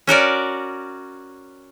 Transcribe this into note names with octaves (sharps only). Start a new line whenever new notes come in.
C#4 F#4 A#4 D5